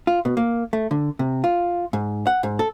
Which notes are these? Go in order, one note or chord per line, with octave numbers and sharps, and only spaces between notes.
F4
B2
A#3
A3
D3
C3
F4
G#2
F#5
G#2
A4